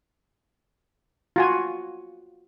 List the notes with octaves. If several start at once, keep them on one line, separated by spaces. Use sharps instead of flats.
F4 F#4 G#5